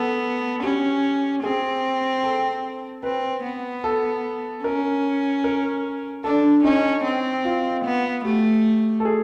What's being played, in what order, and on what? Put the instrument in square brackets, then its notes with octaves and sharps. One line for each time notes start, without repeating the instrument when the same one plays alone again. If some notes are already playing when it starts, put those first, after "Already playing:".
Already playing: [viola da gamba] B3 [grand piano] A4
[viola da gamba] C#4 [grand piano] G4
[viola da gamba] C4 [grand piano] G#4
[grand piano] A4
[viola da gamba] C4 [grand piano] B4
[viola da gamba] B3
[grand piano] A4
[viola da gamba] C#4 [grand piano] A#4
[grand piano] A#4
[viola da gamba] D4 [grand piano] A4
[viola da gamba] C#4 [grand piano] D#4
[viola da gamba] C4
[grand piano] F4
[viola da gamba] B3
[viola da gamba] A3 [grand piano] G4
[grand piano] A4
G#4